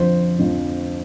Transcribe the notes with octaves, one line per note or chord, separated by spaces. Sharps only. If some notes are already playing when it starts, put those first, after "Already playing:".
Already playing: F2 D3 F3 C5
F2 D3 F3